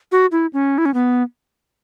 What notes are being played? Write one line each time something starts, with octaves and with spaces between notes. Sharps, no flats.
F#4
E4
C#4
E4
C#4
B3